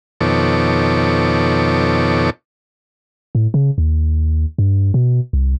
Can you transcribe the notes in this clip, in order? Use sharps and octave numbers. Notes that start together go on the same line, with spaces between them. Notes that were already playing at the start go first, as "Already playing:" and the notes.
F2 B2 D#3 A4 C#5 D6
A2
C#3
D#2
G2
B2
C2